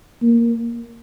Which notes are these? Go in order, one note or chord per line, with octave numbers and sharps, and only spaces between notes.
A#3